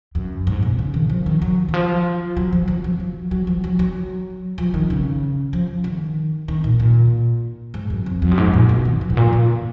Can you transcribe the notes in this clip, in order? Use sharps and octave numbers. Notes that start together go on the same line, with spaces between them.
F#2
G#2
B2
C#3
D#3
F3
D#3
F#3
D#3
F3
F#3
F3
F#3
F3
F#3
F#3
F3
F#3
F#3
F3
D#3
C#3
F3
D#3
D#3
A#2
A#2
G#2
F#2
F2
F2
F#2
G#2
A#2
B2
D#3
F3
G#2
A#2
A#2